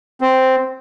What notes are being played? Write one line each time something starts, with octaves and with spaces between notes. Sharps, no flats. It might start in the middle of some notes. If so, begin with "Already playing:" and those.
C4